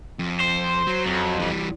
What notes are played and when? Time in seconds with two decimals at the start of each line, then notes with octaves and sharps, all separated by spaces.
0.19 F2
0.41 C5
0.87 F#3
1.07 F2
1.39 E3 G3